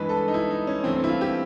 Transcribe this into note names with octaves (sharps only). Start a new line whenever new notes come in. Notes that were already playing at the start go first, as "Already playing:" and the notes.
Already playing: G2 E3 G#3 B4
A4
D#4
E4
D#4
C#4
G2 E3 A3 C4
C4
E4
F4
G4